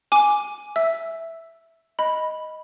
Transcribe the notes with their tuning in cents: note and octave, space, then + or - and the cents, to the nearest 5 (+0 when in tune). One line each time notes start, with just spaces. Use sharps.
G#5 +0 D6 +0
E5 +0 E6 +0
D#5 +5 B5 -5